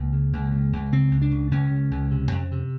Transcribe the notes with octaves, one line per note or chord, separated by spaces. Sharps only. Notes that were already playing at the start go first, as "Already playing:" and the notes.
Already playing: C#2 A#3
C#3
C#2
C#3
C#2
C#3 C4
C#2
D4
C#3
C#2 C#4
C#3
C#2
C3
F2
C3